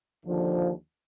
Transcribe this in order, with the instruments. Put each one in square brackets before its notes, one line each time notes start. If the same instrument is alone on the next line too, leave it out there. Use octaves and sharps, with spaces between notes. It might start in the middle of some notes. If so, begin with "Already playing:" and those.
[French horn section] D#2 D3 F3